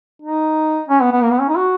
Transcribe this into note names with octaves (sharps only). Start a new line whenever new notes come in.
D#4
C#4
B3
B3
A#3
B3
C#4
D#4
F#4